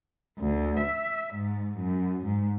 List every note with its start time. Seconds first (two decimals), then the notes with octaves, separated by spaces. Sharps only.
0.39 D2
0.80 E5
1.34 G#2
1.78 F#2
2.25 G#2